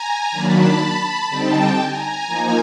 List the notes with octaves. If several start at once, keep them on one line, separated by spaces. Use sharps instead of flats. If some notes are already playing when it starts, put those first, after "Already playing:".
Already playing: G#5 A#5
D#3 F#3 A#3 D4 A5 B5
D3 G3 C4 D#4 G5 A5
G#5 A#5
F3 A#3 D#4